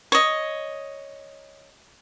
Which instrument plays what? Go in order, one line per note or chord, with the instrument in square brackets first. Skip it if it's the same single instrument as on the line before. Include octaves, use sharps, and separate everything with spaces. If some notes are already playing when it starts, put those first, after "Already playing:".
[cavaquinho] C#5 D#5